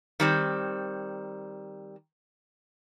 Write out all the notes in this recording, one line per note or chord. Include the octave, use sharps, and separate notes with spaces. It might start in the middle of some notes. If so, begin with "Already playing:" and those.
D#3 G3 C4